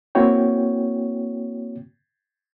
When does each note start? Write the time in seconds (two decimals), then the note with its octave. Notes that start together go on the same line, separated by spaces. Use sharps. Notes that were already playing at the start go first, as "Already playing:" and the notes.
0.15 A#3 C4 E4 F#4 C#5 G5